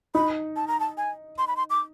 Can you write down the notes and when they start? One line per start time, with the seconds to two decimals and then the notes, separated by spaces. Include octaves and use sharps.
0.15 D#4 B5
0.56 A5
0.68 A#5
0.80 A5
0.97 G#5
1.38 C6
1.48 B5
1.57 C6
1.70 D6